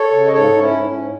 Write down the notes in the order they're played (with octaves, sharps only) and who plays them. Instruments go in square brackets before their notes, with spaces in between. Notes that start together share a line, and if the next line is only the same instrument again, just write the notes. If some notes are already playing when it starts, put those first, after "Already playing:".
Already playing: [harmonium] A4 C#5
C#3
D#5
G#2 A4 C#5
G#2 D#4
C#4 E4
G#2
C#4
G#2